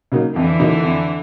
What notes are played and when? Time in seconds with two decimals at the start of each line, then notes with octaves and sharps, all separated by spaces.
0.12 C#3 F#3 A#3 D#4
0.36 F2 D3 E3
0.59 C#3 F#3 A#3 D#4
0.83 F2